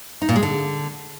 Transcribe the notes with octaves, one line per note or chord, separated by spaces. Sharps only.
D#4
A#2
G#3
D3